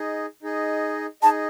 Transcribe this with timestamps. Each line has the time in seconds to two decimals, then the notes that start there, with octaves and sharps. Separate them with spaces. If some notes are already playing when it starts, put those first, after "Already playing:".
Already playing: D#4 G#4 D#5
0.43 D#4 G#4 D#5
1.22 D#4 G#4 D#5 A5